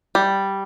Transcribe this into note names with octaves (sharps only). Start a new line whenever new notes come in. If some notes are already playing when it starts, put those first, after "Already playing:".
G3